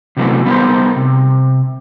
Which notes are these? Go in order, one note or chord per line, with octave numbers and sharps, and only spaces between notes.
C3 E3 F#3 A3 B3 C4
G3 B3 D#4 F#4 A#4 C5
C3